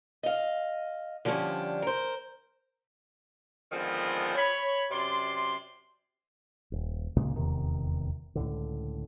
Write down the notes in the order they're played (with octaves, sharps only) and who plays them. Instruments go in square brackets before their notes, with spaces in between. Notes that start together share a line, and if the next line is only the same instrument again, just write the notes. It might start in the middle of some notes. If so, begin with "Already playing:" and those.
[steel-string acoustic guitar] D#5 F5
D3 F3 G3 C#4 D4
A#4 C5
[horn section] D3 D#3 F3 G#3 B3 C4
C#5 B5
F#2 C3 D5 C6
[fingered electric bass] D#1
C#2 A#2 C#3 G#3
D#1 E2 C3 D#3
C#2 A2 D3